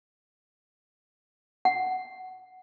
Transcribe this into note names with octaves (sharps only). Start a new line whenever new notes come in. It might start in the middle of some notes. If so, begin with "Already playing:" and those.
F#5